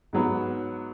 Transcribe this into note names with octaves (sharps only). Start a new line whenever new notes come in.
G#2 F#3 B3